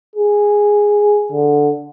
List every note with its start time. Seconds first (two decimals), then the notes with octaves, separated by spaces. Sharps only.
0.16 G#4
1.32 D3